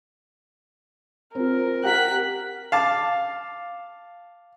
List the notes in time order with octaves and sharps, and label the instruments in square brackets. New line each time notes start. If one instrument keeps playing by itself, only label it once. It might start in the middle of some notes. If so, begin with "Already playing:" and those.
[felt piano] C4 F4 [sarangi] A#4
[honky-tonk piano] G4 F#5 [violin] F#6 B6
[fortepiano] F5 A5 D6